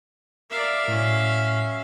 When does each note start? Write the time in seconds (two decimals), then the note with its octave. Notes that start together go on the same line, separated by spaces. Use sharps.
0.50 A#4 D5 E5 F5
0.88 A2 F#3 C#4